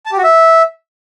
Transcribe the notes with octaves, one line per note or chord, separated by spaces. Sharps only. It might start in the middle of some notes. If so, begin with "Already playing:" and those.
A5
G4
F#4
E5